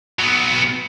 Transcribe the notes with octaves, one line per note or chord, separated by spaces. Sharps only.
F#3 B3